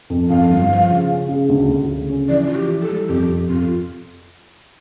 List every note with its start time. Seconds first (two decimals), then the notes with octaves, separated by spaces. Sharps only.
0.10 F2
0.30 F2 F5
0.50 G1
0.70 F3
0.90 C#3
1.10 C#4
1.29 C#3
1.49 D2
1.69 D2
1.89 C#3
2.09 C#4
2.28 E3 D5
2.46 E3 F4
2.55 G4
2.68 E3
2.82 A4
2.89 G3
3.09 F2 G4
3.29 F2
3.48 F2 F4